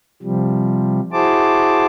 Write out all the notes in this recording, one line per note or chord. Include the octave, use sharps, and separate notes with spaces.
C3 F3 G3
E4 F#4 G#4 C5 A5 D6